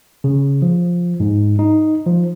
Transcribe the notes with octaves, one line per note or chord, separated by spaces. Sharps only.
C#3
F3
G#2
D#4
F3